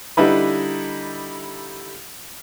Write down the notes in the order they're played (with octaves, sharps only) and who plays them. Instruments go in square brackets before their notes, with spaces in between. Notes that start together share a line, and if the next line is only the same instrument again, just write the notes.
[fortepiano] D3 G3 D#4 E4 B4